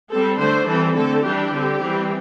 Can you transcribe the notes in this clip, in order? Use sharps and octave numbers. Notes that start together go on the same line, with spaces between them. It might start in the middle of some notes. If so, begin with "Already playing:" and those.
G3 C4 A4
D3 A3 D4 C5
E3 G3 C4 A4
D3 A3 C4 A4
E3 G3 D4 G4
D3 C4
E3 G3 C4